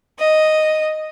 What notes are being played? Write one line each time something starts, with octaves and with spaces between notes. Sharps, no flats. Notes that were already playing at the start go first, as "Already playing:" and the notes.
D#5